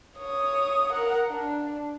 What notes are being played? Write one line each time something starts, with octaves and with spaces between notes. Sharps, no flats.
C#5 D#6
A#4 F#5
D4